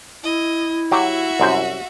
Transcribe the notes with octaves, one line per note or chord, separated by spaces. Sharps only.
E4 D#5
F#3 F#4 G4 E5
C2 F#2 C5